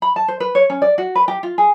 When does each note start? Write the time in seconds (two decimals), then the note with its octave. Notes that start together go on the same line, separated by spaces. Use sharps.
0.02 B5
0.16 A5
0.28 C5
0.40 B4
0.55 C#5
0.70 C#4
0.82 D5
0.98 F#4
1.15 B4
1.28 G4
1.43 F4
1.58 G#4